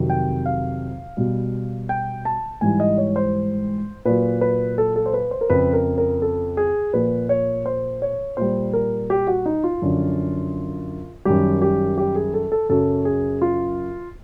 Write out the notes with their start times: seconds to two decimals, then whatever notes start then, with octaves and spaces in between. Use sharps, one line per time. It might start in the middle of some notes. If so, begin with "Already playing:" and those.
Already playing: F2 C3 D#3 F#3
0.10 G5
0.46 F5
1.17 B2 G3
1.89 G5
2.25 A5
2.61 G#2 E3 G3 G#5
2.80 D#5
2.98 C#5
3.16 C5
4.05 A#2 F#3 B4
4.41 B4
4.78 A4
4.96 A4
5.06 C5
5.14 B4
5.31 C5
5.41 A#4
5.50 F2 C#3 F3 B4
5.73 A#4
5.98 A#4
6.22 A4
6.57 G#4
6.93 A#2 F3 B4
7.29 C#5
7.66 C5
8.02 C#5
8.37 A#2 G3 C5
8.73 A#4
9.10 G4
9.27 F#4
9.46 D#4
9.64 F4
9.82 F#2 D3 F3
11.25 F#2 D#3 G3 G4
11.62 G4
11.98 G4
12.16 G#4
12.34 A4
12.52 A4
12.69 F#2 C#3 F#3 A4
13.05 G#4
13.42 F4